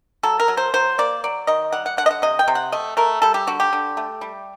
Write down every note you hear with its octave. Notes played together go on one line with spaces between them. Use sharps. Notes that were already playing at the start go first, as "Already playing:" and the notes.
F#3 A4
A#4
F#3
C5
F#3 C5
A#3 D5
F#3 D5
D#3 D#5
G3 F#5
F#5
D3 F#5
D#5
F#5
C3 D#5
G5
C3
F#5
A3 D#5
A3 A#4
G3 A4
G4
D3 F#4
G4
D3
A3
G3